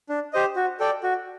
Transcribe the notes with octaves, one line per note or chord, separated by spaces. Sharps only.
D4
G4 C5 D#5
F#4
A4 D5 G5
F#4